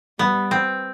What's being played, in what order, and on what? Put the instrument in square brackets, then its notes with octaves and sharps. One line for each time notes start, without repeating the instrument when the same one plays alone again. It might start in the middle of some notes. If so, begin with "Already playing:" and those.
[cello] G3 [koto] B3
[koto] C4